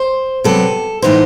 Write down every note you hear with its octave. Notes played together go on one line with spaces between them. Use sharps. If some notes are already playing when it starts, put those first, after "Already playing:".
Already playing: C5
C3 F#3 B3 A4
A2 E3 B3 D#4 C5